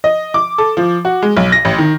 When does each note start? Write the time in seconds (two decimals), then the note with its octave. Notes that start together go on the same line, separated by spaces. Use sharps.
0.04 D#5
0.34 D6
0.58 A4
0.77 F3
1.05 F#4
1.22 G#3
1.37 B1
1.52 A#6
1.65 A1
1.78 D#3